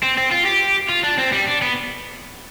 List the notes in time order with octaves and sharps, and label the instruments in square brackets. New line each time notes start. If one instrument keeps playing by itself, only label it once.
[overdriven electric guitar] C4
C4
F4
G4
F4
D4
C4
G3
D4
B3